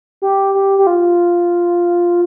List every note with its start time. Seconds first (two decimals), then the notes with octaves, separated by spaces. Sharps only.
0.22 G4
0.54 G4
0.78 G4
0.87 F4